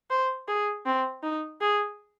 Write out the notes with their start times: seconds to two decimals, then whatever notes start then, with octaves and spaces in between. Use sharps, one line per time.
0.10 C5
0.48 G#4
0.86 C4
1.23 D#4
1.61 G#4